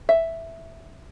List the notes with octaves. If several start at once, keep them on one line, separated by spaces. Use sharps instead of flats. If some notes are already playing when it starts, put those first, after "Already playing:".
E5